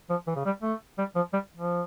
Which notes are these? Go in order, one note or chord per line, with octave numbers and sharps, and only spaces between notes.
F3
E3
C#3
G3
A3
G3
F3
G3
F3